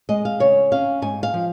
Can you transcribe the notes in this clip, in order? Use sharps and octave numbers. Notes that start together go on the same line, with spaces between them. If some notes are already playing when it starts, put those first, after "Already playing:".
G#3 D#5
F5
C#3 C#5
C#4 F5
G#2 G#5
F5
F3